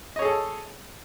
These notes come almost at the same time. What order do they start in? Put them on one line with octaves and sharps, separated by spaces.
D#5 C#5 G#4 A4